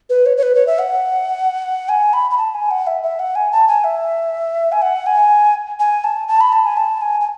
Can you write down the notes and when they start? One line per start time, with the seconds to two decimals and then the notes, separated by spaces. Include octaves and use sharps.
0.10 B4
0.26 C#5
0.37 C#5
0.43 B4
0.55 C#5
0.67 E5
0.79 F#5
1.89 G#5
2.13 B5
2.31 B5
2.38 A5
2.54 G#5
2.71 F#5
2.87 E5
3.03 E5
3.19 F#5
3.35 G#5
3.52 A5
3.68 G#5
3.84 E5
4.72 G#5
4.82 F#5
5.06 G#5
5.79 G#5
6.04 A5
6.28 A5
6.41 B5
6.53 A5
6.65 G#5
6.77 A5
7.01 G#5
7.21 G#5